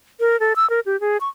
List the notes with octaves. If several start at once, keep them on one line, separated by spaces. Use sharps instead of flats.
A#4
A4
E6
A#4
G4
G#4
C#6